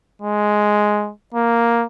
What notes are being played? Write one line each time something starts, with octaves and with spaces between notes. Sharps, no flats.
G#3
A#3